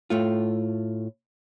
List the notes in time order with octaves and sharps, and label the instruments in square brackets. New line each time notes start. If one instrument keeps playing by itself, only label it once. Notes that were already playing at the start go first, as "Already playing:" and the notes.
[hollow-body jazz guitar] A2 A3 F4